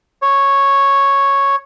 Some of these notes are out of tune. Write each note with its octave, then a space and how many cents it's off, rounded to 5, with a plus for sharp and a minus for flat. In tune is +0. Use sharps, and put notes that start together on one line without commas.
C#5 -5